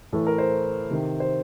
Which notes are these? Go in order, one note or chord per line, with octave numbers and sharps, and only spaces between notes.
A2 E3 A4
A#4
C5
C3 D#3
C5